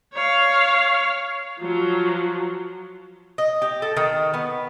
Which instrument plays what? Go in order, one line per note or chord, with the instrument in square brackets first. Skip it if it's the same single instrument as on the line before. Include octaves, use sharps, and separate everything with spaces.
[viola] C#5 F5
F3 F#3
[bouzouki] D#5
G4
A4
D#3
B3